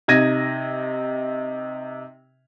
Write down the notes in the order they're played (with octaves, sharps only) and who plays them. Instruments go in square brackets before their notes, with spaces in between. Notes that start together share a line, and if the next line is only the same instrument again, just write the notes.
[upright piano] C3 D#4 G#6 A#6 D#7